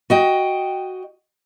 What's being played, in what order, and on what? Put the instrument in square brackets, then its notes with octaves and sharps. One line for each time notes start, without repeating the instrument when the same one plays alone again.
[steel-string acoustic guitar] F#4 D#5 G5